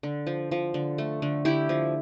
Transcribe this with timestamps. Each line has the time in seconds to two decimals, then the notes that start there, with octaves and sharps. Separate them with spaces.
0.03 D3
0.27 F3
0.51 F3
0.74 D3
0.98 A3
1.22 D3
1.45 D3 E4 G4
1.69 F3